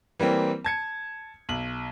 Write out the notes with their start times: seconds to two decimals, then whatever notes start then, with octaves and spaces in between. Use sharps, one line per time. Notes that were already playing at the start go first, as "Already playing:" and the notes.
0.19 E3 G3 A#3 C4
0.65 A5 G#6 C#7
1.49 B1 F#7